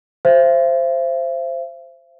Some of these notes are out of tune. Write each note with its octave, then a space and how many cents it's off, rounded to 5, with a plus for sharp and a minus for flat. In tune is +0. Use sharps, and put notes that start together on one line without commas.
C5 +0 E5 +45